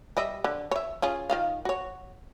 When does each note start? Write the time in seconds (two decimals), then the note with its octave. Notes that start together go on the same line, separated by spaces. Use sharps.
0.17 G3 D#5 E5
0.44 D3
0.71 C#5 E5
1.02 C#4 F4 G#4
1.30 D#3 F4 F5
1.65 F#4 C#5